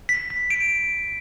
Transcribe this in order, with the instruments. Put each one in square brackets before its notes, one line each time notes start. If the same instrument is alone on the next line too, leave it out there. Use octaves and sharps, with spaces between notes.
[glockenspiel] B6
B6
D7